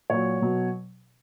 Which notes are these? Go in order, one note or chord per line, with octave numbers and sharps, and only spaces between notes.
A#2 F#3 C#5
B2 F#3